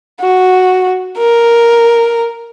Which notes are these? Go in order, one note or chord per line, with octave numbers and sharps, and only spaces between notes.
F#4
A#4